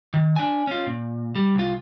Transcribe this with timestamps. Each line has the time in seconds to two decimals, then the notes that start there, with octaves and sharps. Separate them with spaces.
0.14 D#3
0.36 D4 G#5
0.67 C#4 F4
0.87 A#2
1.35 G3
1.55 C2 F4